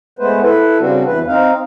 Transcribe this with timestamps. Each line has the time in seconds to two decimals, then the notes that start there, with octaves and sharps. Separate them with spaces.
0.19 G#3 A3 B3 B4 C5
0.42 E4 A4 B4
0.80 C#3 G3 C4 D4 F#4
1.06 E2 E3 B4
1.27 C4 D#4 F5